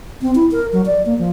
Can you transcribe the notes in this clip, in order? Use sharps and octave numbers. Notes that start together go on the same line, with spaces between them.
C4
E4
A#4
F#3
D5
A#3
F3